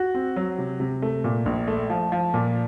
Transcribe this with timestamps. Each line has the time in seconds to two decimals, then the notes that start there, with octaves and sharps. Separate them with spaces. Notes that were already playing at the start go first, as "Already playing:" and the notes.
Already playing: F#4
0.14 C4
0.36 F#3
0.58 C3
0.80 C3
1.02 A3
1.24 A#2
1.46 A#1
1.68 A3
1.90 F3
2.12 F3
2.34 A#2